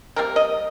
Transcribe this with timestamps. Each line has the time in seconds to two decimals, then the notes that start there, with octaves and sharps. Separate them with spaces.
0.16 C3 G3 A#3 A#4
0.36 D#5